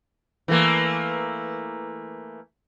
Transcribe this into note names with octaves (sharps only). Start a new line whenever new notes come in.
E3 A3 A#3